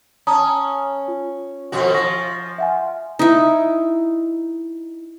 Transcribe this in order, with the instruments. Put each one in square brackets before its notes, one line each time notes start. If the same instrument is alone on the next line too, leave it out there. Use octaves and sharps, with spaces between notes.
[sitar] C#4 [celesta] A5 A#5 D#6
[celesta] F4
[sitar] F2 B2 F#4
[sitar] F3 [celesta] C#6 A#6
[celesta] E5 F#5 G#5
[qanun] D#4 E4